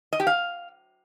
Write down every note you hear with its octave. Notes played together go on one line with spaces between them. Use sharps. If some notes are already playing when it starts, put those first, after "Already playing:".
D#5
G4
F5